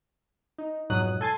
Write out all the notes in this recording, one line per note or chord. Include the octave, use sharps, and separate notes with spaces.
D#4
F2 G#2 B2 F#3 D#6 F#6
A4 G#5 C6 A6